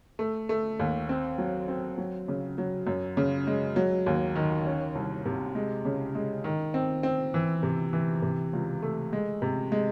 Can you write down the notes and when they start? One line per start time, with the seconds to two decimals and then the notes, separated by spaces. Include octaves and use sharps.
0.19 A3
0.49 A3
0.79 D#2
1.09 C4
1.38 F#3
1.68 C4
1.98 F#3
2.28 C#3
2.58 F#3
2.87 F#2
3.17 C#3
3.47 G#3
3.76 F#3
4.06 D#2
4.35 D#3
4.65 C#4
4.95 C2
5.26 C3
5.55 G#3
5.85 C#3
6.15 G#3
6.44 D#3
6.74 C4
7.03 C4
7.34 E3
7.63 C3
7.93 E3
8.22 C3
8.53 C#2
8.82 A3
9.13 G#3
9.42 C3
9.72 G#3